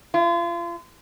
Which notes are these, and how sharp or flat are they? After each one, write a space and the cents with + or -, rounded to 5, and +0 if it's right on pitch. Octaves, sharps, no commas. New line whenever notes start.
F4 -35